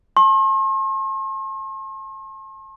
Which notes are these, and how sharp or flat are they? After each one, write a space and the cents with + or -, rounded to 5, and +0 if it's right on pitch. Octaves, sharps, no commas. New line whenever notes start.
A5 +0 C6 +45